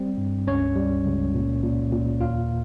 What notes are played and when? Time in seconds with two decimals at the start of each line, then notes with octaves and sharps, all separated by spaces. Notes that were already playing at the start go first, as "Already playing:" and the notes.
Already playing: G3 C4
0.18 G2
0.47 C#2 C#4 C#5
0.76 G3
1.05 C#2
1.34 A#2
1.63 A#2
1.92 A#2
2.20 D#2 F4 F5